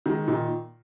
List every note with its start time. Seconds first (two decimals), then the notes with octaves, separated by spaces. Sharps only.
0.06 D#3 G#3
0.28 A#2 D#3